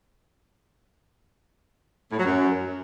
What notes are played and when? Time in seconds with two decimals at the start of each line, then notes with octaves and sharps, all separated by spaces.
2.12 A2
2.18 F#3
2.25 F#2